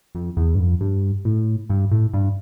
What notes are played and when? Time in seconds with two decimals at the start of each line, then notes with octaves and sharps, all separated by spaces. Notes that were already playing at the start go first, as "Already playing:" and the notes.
0.15 F2
0.37 E2
0.55 G2
0.59 F2
0.81 G2
1.25 A2
1.70 G2
1.91 A2
2.13 G2